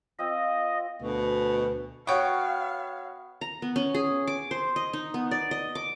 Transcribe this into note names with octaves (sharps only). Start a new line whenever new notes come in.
C4 F4 D#5
D2 B2
B3 F#4 C#5 F5 G5 C#6
A#5
B3
C#4
G#4
D6
C5
D#5
D#4
B3
D5
D#5
D6